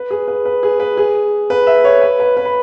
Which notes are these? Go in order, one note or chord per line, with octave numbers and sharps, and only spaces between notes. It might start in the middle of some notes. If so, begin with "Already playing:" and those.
Already playing: B4
G#4
B4
B4
G#4
B4
G#4
B4
E5
C#5
B4
B4
B4
B5